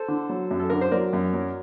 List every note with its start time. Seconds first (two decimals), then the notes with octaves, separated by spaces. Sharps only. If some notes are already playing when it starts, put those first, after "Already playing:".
Already playing: A4 C5
0.08 D3
0.29 F#3
0.51 F#2
0.59 A4
0.70 D3 A#4
0.81 C5
0.91 F#3 A#4 D5
1.13 F#2
1.34 F#3